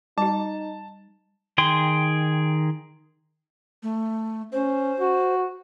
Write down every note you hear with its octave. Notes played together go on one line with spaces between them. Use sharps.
G3 D#4 F#4 A5
D#3 G#4 G5 C6
A3
C#4 C5
F#4